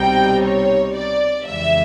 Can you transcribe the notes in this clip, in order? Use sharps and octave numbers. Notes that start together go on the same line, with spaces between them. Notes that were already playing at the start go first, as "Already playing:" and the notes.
Already playing: C2 B2 G3 C4 D#4 G5
C#5
D5
F2 C#3 E3 G#3 E5